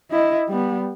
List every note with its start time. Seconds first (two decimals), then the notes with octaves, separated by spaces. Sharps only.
0.11 E4 D#5
0.48 G3 B3